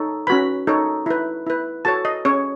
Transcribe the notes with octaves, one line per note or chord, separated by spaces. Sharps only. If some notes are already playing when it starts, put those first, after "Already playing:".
Already playing: D#4 A4 C#5
C#4 F#4 B4 B5
D#4 A4 C#5
E4 B4
E4 B4
F#4 A4 C#5 A5
D#5
C#4 G#4 C#5